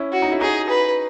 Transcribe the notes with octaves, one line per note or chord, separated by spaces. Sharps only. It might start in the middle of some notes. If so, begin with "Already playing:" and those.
Already playing: C#4 E4
F#4
D#4
E4
D#4 F#4 G#4
B4